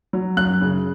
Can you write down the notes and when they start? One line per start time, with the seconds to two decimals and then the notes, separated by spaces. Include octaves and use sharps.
0.13 F#3
0.37 F#2 F#6
0.61 C#3